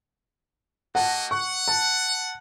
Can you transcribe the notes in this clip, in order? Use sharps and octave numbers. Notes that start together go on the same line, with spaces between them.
A#3 F#4 D#5 F#5 A5
F#5 C#6
A5